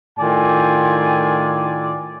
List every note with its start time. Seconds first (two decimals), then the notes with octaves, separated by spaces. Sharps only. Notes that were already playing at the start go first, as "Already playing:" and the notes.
0.20 A2 D#3 F4 D5 G5 G#5